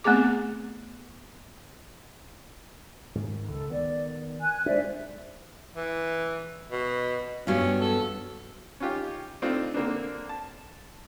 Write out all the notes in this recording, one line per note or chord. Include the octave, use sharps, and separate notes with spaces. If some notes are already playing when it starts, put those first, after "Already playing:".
A3 B3 C4 G#4 D6
G#2 D#3
C#2 A4
D#3 B3 D5
G#5 F#6
G#3 D4 C5 D5 E5
E3
B2
G2 F#3 B3 C#4
A4
C#4 D#4 F4 G4
A3 C4 D4 D#4 F4 D#5
D3 A#3 C4 D4
A5